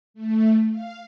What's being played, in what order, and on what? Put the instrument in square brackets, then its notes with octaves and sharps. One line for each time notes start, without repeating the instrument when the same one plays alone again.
[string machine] A3
F5